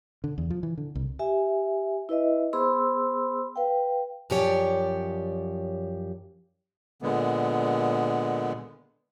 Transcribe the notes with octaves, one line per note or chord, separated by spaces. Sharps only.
D3
E2
F3
E3
D3
C2
G4 E5 G#5
E4 B4 D#5 E5
B3 G#4 C5 B5 C6 E6
B4 F5 G5
F#2 F3 G4 C#5 D5
A#2 D3 G#3 B3